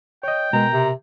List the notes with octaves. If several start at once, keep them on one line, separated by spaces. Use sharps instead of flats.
C#5 D#5 G5
B2 G#3 A#4 A#5
C3